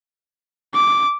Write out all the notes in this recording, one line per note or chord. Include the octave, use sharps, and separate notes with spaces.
D6